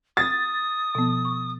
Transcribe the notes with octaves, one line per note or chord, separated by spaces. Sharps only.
D#6 A6
B2 F3 B3
C#6